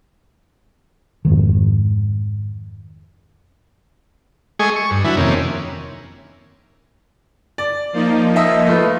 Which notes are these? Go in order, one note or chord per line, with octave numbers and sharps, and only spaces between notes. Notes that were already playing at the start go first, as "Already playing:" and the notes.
F2 G#2 D#3
G#3 A3 G#4 D#5 G#5 C#6
C#6
G2
D3 E3 F#3 E4
F2 C3 D#3 A#3 C#4
D5
F3 A#3 D#4
D#5 E5
A3 F4 B4